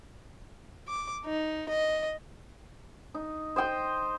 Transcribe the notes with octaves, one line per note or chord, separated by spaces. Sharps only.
D6
D#4
D#5
D#4
C5 D#5 G5 C6